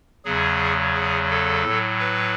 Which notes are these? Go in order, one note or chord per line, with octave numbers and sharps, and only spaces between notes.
E2 C#3 F#3 G#4
G#4
A4
A2 F#3
B4